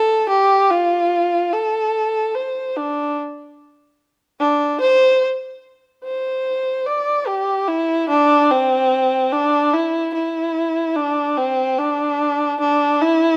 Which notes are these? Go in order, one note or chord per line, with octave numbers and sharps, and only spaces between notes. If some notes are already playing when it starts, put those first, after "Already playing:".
Already playing: A4
G4
F4
A4
C5
D4
D4
C5
C5
D5
G4
E4
D4
C4
D4
E4
E4
D4
C4
D4
D4
E4